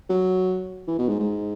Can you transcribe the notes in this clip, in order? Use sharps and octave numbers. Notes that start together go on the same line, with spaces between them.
F#3
E3
B2
G#2
G#2